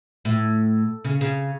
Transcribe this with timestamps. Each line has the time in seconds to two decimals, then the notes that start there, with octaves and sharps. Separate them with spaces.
0.25 A2
1.05 C#3
1.21 C#3